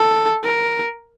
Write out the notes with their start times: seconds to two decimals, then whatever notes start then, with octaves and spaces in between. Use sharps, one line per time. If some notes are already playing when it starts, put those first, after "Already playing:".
Already playing: A4
0.44 A#4